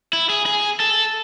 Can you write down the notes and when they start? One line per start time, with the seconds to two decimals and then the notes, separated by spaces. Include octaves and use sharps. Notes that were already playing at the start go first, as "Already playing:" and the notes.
0.13 E4
0.30 G#4
0.46 G#4
0.80 A4